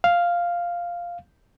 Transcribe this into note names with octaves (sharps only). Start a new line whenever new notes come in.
F5